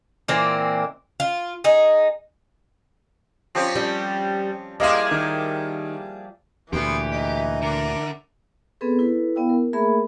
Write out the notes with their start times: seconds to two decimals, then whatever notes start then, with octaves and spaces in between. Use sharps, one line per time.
0.28 A#2 E3 A#3 C4
1.20 F4
1.64 D#4 G#4
3.55 F3 C4 C#4 G4 D5
3.75 G3
4.80 G3 A#3 E4 G#4 D#5 F5 C6
5.11 D#3
6.73 D2 A#2 E3 B3 G4 C5
7.12 D#4
7.62 D3 A#4 D5
8.81 B3 C4 G#4 A4 B4
8.99 E4 A4 B4
9.36 B3 E4 D5 F5 G5 E6
9.49 A#4
9.73 A3 A#3 G#4 A#4 E5 B5